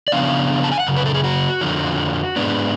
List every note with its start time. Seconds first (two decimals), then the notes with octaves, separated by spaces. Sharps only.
0.08 D5
0.12 C#3 F3 B3 D4 F5
0.64 A5
0.71 G#5
0.80 F#5
0.87 F#2 C#3
0.97 B4
1.06 A4
1.14 G#4
1.24 F#4
1.61 F2 D3 F3
2.36 G#2 G#3 B3 D4